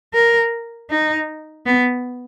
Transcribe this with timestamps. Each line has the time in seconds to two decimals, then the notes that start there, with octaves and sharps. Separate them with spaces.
0.14 A#4
0.90 D#4
1.66 B3